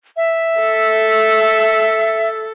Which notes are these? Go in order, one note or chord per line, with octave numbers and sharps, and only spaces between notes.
E5
A4